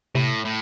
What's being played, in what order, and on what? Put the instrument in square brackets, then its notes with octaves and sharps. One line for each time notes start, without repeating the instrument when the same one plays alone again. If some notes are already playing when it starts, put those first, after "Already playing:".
[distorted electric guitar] A2 [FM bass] C3
[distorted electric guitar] A2